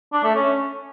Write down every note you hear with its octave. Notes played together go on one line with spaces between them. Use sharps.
D4
A3
C#4